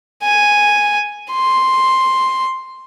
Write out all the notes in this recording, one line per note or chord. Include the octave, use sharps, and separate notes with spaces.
G#5
C6